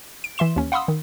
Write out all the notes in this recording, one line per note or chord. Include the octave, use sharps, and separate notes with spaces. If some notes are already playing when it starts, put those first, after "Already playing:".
D7
E3 E5 C6 E7
D#2 C#4
F5 F#5 B5 C6 D#6 E6
D#3